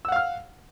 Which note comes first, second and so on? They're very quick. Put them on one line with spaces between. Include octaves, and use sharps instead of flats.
E6 F#5 F5 F6